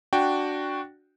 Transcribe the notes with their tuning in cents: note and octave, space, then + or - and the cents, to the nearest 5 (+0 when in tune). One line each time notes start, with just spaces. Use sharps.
D4 +0 F#4 +0 G5 +0